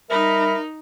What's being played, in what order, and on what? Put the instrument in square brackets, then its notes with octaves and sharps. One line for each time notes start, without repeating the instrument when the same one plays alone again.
[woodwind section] G3 E5 B5 [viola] D#4 [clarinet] A#4